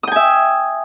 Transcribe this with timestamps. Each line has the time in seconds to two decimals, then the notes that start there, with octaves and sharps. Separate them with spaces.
0.03 D#6
0.08 G5
0.12 G#5
0.16 E5